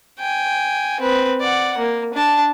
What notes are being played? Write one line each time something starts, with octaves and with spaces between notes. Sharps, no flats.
G5 G#5
C4 B4
D5 F#5
A#3
D4 A5